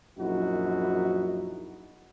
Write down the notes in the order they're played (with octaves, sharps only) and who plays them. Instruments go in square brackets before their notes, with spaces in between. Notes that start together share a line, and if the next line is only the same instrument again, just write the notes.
[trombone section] A#1 F#2 D#4 E4 F#4